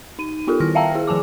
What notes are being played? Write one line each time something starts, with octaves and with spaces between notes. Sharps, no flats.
D#4 D#7
B3 F4 G4 A4 A#4
D#3 E4 F6 A#6
E5 F5 G5 A5 A#5 E6
E4 G#4
D#3 F3 G#5 A5 D6